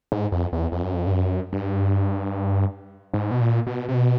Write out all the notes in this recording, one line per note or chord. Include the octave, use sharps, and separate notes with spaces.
G#2
F2
E2
F2
F#2
F2
G2
F#2
G2
G#2
B2
A#2
B2
C3
B2